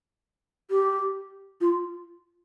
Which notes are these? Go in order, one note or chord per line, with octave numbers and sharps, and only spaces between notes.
G4
F4